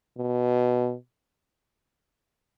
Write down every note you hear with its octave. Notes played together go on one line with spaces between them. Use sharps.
B2